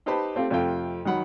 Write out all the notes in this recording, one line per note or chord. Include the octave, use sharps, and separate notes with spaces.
D#4 G4 B4 C5 A5 B5
A3 C4 F4 G4
F2 C3 A3 F4 G5
D#3 F#3 F#5 B5